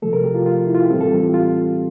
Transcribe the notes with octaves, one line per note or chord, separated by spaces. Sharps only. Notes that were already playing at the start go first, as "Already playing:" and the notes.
C3 F3 A3 A4
A#4
G4
F4
F4
E4
F4
G4
A2 E3 G3 C4 A4
A4
G4
F4
F4